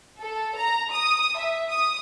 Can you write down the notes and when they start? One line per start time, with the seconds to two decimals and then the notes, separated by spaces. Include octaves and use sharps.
0.21 A4
0.57 A#5
0.91 D#6
1.37 E5
1.69 D#6